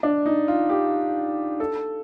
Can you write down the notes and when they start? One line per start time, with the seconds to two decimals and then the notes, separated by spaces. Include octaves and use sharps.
0.03 D4
0.26 D#4
0.48 F4
0.70 G4
1.60 A4